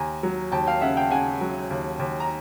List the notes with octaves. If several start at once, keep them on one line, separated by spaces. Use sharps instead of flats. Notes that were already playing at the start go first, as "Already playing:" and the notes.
Already playing: D#2 G#5 A#5
F#3
D#2 G5 A5
F5 G5
C#3 E5 F#5
F5 G5
C#3 F#5 G#5
F#3
D#2
D#2
A#5